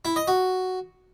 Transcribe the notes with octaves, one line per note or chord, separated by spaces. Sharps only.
E4
D#5
F#4